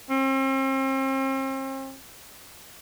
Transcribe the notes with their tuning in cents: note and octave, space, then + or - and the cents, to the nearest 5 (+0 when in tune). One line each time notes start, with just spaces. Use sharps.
C4 +40